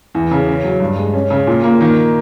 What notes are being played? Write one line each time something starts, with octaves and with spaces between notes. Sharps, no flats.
E2
C#3
C#4
F#3
G2
G#3
C#4
C#3
A#2
A#3
D#3